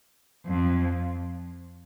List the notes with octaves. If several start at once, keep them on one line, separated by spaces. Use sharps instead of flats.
F2